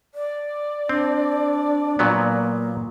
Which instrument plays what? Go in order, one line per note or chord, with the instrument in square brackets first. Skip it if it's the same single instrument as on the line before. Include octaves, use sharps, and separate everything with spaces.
[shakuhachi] D5
[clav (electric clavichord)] C4 [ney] D4
[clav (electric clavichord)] A#2 F#3 B3 [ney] A#3